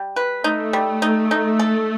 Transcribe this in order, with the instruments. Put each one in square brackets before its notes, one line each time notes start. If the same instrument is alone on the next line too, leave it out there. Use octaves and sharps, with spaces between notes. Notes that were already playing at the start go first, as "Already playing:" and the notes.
Already playing: [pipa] G3
B4
[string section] A3 [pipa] D#4
[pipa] G3
D#4
D#4
A4